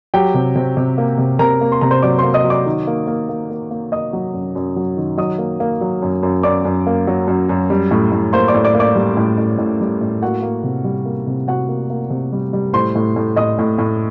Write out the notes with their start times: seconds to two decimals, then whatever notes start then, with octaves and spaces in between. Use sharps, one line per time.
0.14 F#3 G4 G5
0.34 C3
0.56 C3
0.77 C3
0.98 A#3
1.18 C3
1.39 C3 A#4 A#5
1.61 A#3
1.72 C6
1.81 C3 A#5
1.91 C5 C6
2.02 F#3 D5 D6
2.18 A#3 C5 C6
2.34 D#5 D#6
2.44 F#3
2.50 D5 D6
2.66 D#3
2.87 A#3
3.07 A#3
3.29 A#3
3.50 A#3
3.71 A#3
3.92 A#3 D#5 D#6
4.13 F#3
4.34 F#2
4.55 F#2
4.76 F#3
4.97 D#3
5.17 F#3 D#5 D#6
5.38 A#3
5.60 A#3
5.81 F#3
6.02 F#2
6.23 F#2
6.43 F#2 D5 D6
6.65 F#2
6.87 A#3
7.07 F#3
7.28 F#2
7.49 F#2
7.70 G3
7.91 A2
8.12 A2
8.33 A#3 C5 C6
8.48 D5 D6
8.54 A2
8.65 D5 D6
8.75 A#3
8.80 D5 D6
8.95 G3
9.17 A2
9.38 A2
9.59 A2
9.81 G3
10.01 A2
10.22 A#3 F#4 F#5
10.43 A#3
10.64 C3
10.84 G3
11.05 A#3
11.27 C3
11.48 C3 F#4 F#5
11.69 A#3
11.90 A#3
12.10 C3
12.33 G3
12.53 G3
12.73 A2 C5 C6
12.95 A2
13.16 A2
13.36 A2 D#5 D#6
13.59 A2
13.78 A2